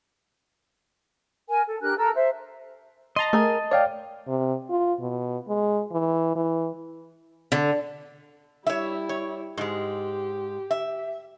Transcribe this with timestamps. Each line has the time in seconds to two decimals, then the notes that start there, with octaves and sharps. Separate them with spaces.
1.49 A#4 G#5
1.66 A4
1.81 D4 G4 A#4 F#6
1.97 A4 A#4 A#5 E6
2.15 C5 E5
3.16 D#5 A5 A#5 C6
3.33 A3 G#4 A#4
3.71 C#5 D5 F5 G5
4.28 C3
4.69 F4
5.00 B2
5.48 G#3
5.92 E3
6.35 E3
7.52 D3
8.67 G3 E4 C#5 E5
9.09 C#5
9.57 G#2 G#3 G4
10.71 E5